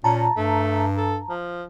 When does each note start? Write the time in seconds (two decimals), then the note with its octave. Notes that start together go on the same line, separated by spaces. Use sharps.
0.04 A#2 C#4 A5 A#5
0.37 G2 A3
0.97 A4
1.30 F3